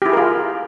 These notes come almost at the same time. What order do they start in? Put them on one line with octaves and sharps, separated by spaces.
G4 E4 G#4 A#4 F4